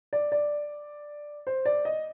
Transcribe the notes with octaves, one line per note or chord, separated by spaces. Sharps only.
D5
D5
C5
D5
D#5